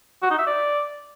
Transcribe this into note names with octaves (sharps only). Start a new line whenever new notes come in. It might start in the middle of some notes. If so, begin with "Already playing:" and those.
F#4
D#4
E5
D5